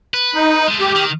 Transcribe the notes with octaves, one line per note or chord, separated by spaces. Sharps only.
B4
D#4
G#3 A3
G4
D#3